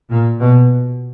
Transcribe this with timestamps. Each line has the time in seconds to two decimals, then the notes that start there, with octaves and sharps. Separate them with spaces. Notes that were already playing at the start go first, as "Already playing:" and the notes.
0.09 A#2
0.40 B2